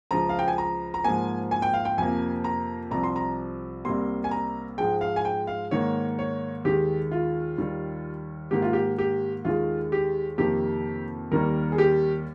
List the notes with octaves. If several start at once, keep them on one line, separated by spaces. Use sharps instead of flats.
C#2 C#3 F3 A#5
F5
G5
G#5
A#5
A#5
G#2 F3 A#3 G#5
G#5
G5
F5
G5
F2 C3 F3 A#3 G#5
A#5
C2 C3 F3 A#5
C6
A#5
C2 C3 G3 A#3 C6
G#5
A#5
G#2 F3 G#3 G5
F5
G#5
G5
F5
G#2 D#3 A#3 C#5
C#5
D#2 D#3 G#3 G4
F4
D#2 D#3 G3
G#2 D#3 A#3 G4
F4
G4
G4
D#2 D#3 G#3 F4
G4
F2 C3 D#3 A#3 G4
D#2 D#3 G3 A#3 A#4
G#4
G4